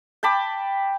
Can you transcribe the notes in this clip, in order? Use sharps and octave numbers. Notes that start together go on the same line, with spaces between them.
G5 A5 B5 D6